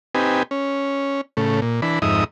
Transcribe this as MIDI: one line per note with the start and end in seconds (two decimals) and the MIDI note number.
0.15 0.43 60
0.15 0.43 63
0.15 0.43 67
0.15 0.43 71
0.15 0.43 80
0.51 1.21 61
1.37 1.60 45
1.37 1.60 49
1.37 1.60 57
1.62 1.81 46
1.82 1.99 52
1.82 1.99 62
1.82 1.99 83
2.02 2.24 41
2.02 2.24 44
2.02 2.24 63
2.02 2.24 76
2.02 2.24 87